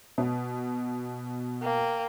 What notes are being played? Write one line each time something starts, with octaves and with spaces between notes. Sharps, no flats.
B2
A#3 G5